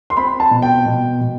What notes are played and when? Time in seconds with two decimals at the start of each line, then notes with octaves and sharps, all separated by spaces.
0.10 C6
0.17 C4 B5
0.40 A5
0.51 B2
0.62 G5
0.86 B2
1.21 B2